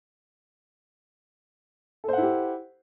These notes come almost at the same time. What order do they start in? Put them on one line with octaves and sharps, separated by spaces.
A4 C5 F#5 E4 G4